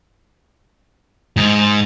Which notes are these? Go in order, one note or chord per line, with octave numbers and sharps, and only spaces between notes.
G#2